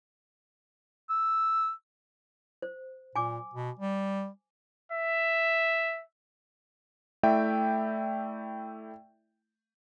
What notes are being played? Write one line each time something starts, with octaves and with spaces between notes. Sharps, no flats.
E6
C5
A#2 G#5 D6
B2
G3
E5
A3 E4 D5 E5 G5